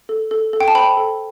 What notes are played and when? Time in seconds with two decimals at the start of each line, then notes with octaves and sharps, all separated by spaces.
0.09 A4
0.31 A4
0.53 A4
0.61 G5
0.68 A5
0.75 C5 G5 B5
0.97 A4